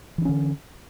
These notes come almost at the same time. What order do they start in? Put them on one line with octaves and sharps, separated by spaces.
E3 D4 C#4 D3